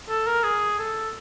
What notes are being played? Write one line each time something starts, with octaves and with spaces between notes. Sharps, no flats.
A4
A#4
G#4
A4